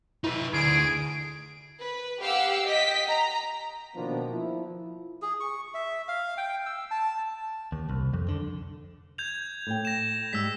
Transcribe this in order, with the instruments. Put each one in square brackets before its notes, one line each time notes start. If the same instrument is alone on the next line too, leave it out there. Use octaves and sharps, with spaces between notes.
[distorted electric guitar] D#4 B4 [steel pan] E4
[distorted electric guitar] D2 [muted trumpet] G#4 [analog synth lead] D7
[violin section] B4
G4 F5 F#5 E6
D#5 G5 B6
A#5
[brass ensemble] B2 D#3 F3 A#3 B3 D4
F3 E4
[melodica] G#4
C#6
E5
F5
G5
E6
A5
[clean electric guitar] D#2
C2
F2
D3
[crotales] G6 G#6 F7
[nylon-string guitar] A2 G5
[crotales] A#6 E7
[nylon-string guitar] G#2 G3 G#3 [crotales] E6 B6